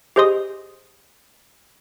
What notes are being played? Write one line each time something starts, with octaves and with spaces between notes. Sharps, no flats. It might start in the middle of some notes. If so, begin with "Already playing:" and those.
G4 G#4 C5 D#5 C6 D#6